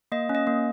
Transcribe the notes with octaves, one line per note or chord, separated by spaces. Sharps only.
A#3 D#5
C#4
D#5
A#3